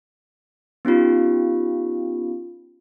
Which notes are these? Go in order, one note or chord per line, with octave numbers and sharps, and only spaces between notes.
B3 C#4 D#4 F4 G4